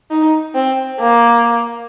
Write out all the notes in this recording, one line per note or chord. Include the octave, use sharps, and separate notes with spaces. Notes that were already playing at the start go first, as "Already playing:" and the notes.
D#4
C4
A#3